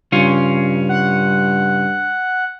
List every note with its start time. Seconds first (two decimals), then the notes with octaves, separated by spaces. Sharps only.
0.12 G2 C#3 C#4 F4
0.89 F#5